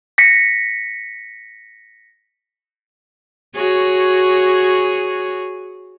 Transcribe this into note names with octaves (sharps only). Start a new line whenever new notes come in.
A#6 B6 C#7
F#4 G#4 C#5